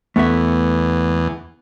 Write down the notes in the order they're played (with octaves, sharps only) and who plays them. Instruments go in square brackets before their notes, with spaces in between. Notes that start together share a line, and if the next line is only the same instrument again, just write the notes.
[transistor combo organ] E2 [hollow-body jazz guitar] A3 B3 E5